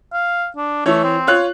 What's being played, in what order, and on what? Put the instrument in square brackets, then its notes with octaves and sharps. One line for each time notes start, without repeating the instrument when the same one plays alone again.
[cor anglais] F5
D4
[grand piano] E3 C#5 [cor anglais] A3
[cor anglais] C4
[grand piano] F4 C#5 F#6